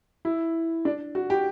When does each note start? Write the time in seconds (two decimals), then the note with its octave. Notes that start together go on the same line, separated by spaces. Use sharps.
0.25 E4
0.85 D4
1.15 F#4
1.30 G4